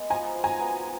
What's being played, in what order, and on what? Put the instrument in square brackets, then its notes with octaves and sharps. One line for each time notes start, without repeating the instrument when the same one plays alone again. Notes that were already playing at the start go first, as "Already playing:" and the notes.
Already playing: [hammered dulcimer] G#3 B3
[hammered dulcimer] F3 [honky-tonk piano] G#5 A#5
[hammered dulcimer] F3
[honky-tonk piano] G#5 A#5
[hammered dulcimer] B3